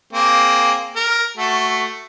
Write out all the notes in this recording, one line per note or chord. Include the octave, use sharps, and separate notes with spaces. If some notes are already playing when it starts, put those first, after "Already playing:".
A#3 C4 G#4
A#4
A3 F#4 A4